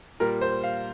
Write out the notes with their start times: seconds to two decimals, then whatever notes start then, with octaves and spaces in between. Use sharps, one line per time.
0.20 A#2 G3 A#4
0.41 C5
0.64 F5